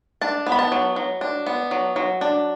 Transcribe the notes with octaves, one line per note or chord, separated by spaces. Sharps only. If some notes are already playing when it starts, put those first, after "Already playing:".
D4 A5
B3
B5
A5
F#3
F#3
D4
B3
F#3
F#3
D4